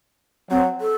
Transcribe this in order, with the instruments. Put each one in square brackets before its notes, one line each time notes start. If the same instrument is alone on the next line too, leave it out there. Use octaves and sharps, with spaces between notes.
[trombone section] F#3 [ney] C4
[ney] A4